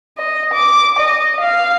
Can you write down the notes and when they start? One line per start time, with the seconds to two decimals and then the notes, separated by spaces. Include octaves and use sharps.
0.18 D#5
0.53 D6
0.99 D#5
1.40 F5